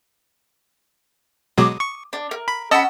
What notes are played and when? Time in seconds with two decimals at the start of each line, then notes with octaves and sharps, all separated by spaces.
1.58 B2 F#3 G#3 D6 D#6
1.80 C#6
2.13 D4
2.31 A#4
2.48 B5
2.71 C#4 D#5 F#5 A5 B5 E6